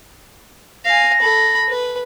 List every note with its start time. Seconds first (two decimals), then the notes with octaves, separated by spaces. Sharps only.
0.85 F5 G#5 A#6
1.21 A4 B5
1.69 B4